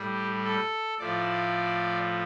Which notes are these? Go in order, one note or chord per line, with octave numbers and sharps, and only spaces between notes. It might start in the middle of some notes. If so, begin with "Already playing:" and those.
Already playing: A2 G3 G4
A4
A2 F3 D5